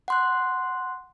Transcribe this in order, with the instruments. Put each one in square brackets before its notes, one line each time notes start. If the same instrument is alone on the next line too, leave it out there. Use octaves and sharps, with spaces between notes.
[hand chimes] F#5 C6 F#6